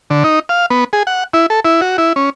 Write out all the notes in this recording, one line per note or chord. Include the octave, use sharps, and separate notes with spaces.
D3
D#4
F5
B3
G#4
F#5
E4
A4
E4
F#4
E4
C#4